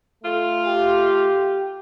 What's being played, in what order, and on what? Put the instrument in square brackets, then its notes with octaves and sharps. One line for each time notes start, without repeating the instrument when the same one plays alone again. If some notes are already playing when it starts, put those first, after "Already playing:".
[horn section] A3 F4
[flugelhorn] G4